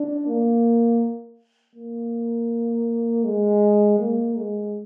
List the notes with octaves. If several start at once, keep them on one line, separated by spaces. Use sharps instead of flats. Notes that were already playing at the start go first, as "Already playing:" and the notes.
Already playing: D4
A#3
A#3
G#3
A#3
G#3